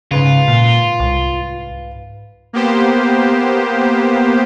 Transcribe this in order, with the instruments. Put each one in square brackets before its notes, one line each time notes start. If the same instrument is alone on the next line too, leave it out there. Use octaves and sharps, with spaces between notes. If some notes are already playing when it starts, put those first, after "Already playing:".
[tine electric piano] G#2 B4 F5 [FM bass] C#3 [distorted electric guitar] F4
[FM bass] A#2
C2
[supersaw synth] A#3 B3 G4 C5